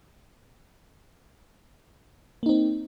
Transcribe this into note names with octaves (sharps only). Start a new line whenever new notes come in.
A#3 C4 D#4